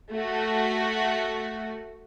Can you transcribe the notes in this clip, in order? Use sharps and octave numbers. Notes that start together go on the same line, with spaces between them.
A3 F#4